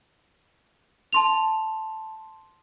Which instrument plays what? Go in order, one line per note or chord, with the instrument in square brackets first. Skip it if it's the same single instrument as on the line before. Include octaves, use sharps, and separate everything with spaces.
[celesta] A5 C6 F7